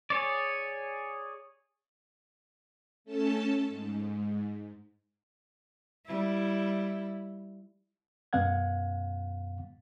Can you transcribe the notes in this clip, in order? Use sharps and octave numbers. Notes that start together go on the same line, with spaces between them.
G#4 C#5 D5
A3 C#4 A4 A5
G#2
G3 E4
F#2 B2 B3 F5 F#5 G#6